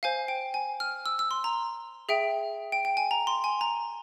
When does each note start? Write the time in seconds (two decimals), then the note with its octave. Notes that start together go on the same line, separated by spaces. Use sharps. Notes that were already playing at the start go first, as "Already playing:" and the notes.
0.03 C5 F5 G#5
0.28 G5
0.54 G#5
0.80 F6
1.06 E6
1.19 E6
1.31 C6
1.44 A#5
2.09 G#4 E5 G5
2.72 G5
2.85 G5
2.97 G#5
3.11 A#5
3.27 C6
3.44 G#5
3.61 A#5